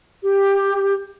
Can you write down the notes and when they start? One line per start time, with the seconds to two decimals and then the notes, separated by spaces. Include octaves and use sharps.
0.24 G4